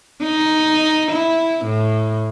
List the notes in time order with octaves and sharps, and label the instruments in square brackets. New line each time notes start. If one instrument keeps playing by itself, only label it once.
[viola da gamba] D#4
E4
A2